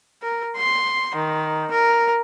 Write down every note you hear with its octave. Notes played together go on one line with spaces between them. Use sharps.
A#4
C6
D#3
A#4